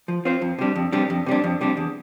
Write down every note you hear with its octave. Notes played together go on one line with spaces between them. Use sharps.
F3
C4 F4 C5
F2
C3 G3 D4
F2
C3 G3 D4
F2
C3 G3 D4
F2
C3 G3 D4
E2